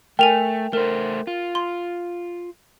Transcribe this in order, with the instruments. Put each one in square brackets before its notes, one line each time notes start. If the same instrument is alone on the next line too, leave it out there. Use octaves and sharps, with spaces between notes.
[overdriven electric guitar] A3 [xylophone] A#4 G#5 [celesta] G5 F7
[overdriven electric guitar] A3 C5 [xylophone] A#4
[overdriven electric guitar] F4
[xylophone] C6